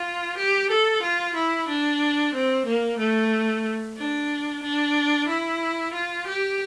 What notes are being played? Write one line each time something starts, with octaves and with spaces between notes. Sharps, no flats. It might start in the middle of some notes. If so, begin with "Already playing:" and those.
Already playing: F4
G4
A4
F4
E4
D4
C4
A#3
A3
D4
D4
E4
F4
G4